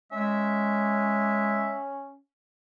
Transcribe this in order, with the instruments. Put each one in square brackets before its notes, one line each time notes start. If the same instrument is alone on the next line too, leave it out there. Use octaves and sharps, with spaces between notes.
[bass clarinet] G#3 [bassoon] C#4 [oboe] E5